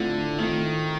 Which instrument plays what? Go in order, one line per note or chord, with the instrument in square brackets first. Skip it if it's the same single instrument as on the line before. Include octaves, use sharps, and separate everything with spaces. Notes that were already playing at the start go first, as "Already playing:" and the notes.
Already playing: [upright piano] A2 A3 C4 F4 [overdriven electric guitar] D3
[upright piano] A2 A3 C4 F4 [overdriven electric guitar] D#3